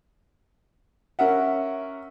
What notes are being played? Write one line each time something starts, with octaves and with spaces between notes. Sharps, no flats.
C#4 A#4 E5 F#5